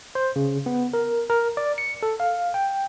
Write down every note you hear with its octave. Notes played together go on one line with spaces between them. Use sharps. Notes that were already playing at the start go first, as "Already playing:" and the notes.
C5
C#3
B3
A#4
A#4
D5
C#7
A4
F5
G5